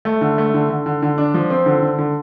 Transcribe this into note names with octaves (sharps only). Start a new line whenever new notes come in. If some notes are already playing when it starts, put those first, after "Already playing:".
A3
D3
A3
D3
D3
D3
D3
D4
F3
C4
D3
D3
D3